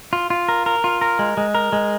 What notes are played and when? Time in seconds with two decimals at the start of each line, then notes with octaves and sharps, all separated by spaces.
0.13 F4
0.30 F4
0.49 A#4
0.66 A#4
0.84 F4
1.01 A#4
1.19 G#3
1.37 G#3
1.55 A#4
1.73 G#3